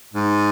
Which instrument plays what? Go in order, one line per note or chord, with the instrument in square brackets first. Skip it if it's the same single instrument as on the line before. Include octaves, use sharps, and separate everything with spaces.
[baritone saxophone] G#2